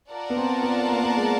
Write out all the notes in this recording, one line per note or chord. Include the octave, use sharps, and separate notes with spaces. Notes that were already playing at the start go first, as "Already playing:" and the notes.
F4 A#4 D5 F#5 A5
B3
C4
B3
A#3
B3
A#3
G#3